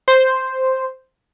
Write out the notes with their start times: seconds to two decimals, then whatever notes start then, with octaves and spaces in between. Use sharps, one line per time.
0.08 C5